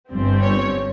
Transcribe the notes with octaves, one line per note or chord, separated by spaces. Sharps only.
G1 G2 G3 C4
C#5